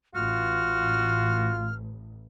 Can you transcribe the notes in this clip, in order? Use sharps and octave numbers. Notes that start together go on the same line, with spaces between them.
A1 F4 F#4 F6